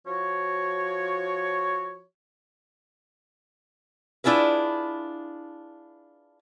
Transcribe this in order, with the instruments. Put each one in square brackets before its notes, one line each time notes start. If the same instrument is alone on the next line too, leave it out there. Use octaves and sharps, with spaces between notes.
[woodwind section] F3 F#4 C#5
[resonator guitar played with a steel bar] D4 E4 F4 G#4 B4